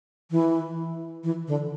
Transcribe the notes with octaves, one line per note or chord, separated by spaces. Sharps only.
E3
E3
D3